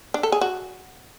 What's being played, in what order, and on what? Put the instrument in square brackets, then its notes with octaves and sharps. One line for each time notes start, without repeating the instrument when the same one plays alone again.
[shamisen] D4
A4
G#4
F#4